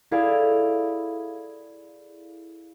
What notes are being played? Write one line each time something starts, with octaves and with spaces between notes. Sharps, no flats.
E4 G#4 A4 D5 F5